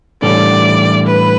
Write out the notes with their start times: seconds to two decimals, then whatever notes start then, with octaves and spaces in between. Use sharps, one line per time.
0.22 A2 E3 G3 D4 A4 D5
1.07 B4